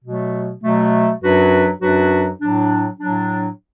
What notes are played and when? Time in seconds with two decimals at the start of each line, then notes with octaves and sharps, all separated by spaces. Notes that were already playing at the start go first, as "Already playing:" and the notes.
0.03 B2 F#3 A3
0.62 B2 F#3 A3
1.22 F#2 F#3 D4 F#4 B4
1.81 F#2 F#3 D4 F#4 B4
2.41 A2 F#3 D4
3.00 A2 F#3 D4